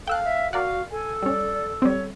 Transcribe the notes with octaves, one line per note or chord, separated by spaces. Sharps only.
A4 F5 G5 E6 F#6
E5
F#4 A#4 D5 F5 F#5
A4 G#5
G3 C#4 D5
G3 C4 C#5